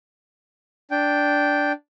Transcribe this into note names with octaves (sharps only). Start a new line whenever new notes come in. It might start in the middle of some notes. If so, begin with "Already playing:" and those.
D4 G5